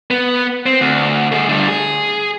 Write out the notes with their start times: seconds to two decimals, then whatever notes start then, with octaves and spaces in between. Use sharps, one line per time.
0.10 B3
0.66 C4
0.81 D2
1.32 A3 G#4
1.49 D3 G3
1.68 G#4